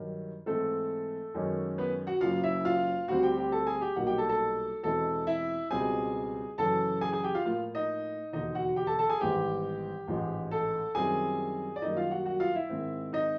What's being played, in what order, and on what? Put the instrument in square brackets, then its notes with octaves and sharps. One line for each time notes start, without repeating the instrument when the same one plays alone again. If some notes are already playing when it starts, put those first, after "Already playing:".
Already playing: [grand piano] G2 D#3 F#3
G#2 E3 G#3 A3 C4 A4
F#2 D#3 G#3 C#4
B3 B4
F#4 F#5
F#1 F#2 C#3 F#3 F4 F5
E4 E5
F4 F5
D2 D3 G3 C4 F#4 F#5
G4 G5
G4 G5
A4 A5
G#4 G#5
G4 G5
B1 A#2 G3 A#3 D#4 F#4 F#5
G4 G5
A4 A5
A4 A5
E2 B2 G#3 C4 E4 A4 A5
E4 E5
C#2 B2 G3 C4 G#4 G#5
F#2 C#3 E3 A4 A5
G#4 G#5
G#4 G#5
G4 G5
F4 F5
A2 F3 A#3 F4 F5
D#4 D#5
E1 D#2 D3 D#4 D#5
F#4 F#5
G4 G5
A4 A5
A4 A5
G#4 G#5
G#1 G#2 E3 G3 B3 G4 G5
A1 G#2 F3 G#3
A4 A5
F#2 D#3 G3 C4 E4 G#4 G#5
D5
F#2 D#3 G3 A#3 D#4 D#5
F4 F5
F#4 F#5
F#4 F#5
F4 F5
E4 E5
G#2 D#3 G#3 C4
D#4 D#5